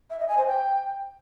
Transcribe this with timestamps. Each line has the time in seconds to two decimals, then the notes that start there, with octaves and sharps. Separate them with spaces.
0.10 E5
0.19 D#5
0.28 G#5
0.37 C5
0.46 G5